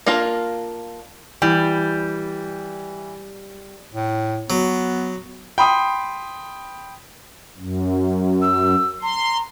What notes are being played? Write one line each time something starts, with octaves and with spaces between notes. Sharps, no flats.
A#3 D4 F4 A#4
E3 G3
A2
F#3 B3
G5 B5 C6 D#6
F#2
E6
A#5 C6